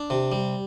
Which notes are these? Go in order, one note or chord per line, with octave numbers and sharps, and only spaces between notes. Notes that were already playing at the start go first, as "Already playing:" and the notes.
Already playing: D4
C3
G3